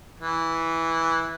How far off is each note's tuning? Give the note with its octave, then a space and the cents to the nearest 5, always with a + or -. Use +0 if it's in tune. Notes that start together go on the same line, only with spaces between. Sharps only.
E3 -10